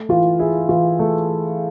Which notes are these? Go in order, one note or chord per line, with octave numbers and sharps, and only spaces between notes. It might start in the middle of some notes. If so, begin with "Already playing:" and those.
Already playing: A3
E3 F4
E4 G#4
E3 F4
A3